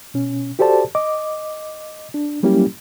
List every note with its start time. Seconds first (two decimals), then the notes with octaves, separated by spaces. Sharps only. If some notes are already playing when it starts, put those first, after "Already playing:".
0.14 B2 C#4
0.59 F#4 G4 A4 C5 D5 A5
0.95 D#5 D6
2.14 D4
2.43 F#3 G3 A#3 C#4 E4 G4